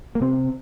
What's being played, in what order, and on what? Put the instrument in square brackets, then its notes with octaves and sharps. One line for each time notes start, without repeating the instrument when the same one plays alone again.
[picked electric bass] A#3
C3 C4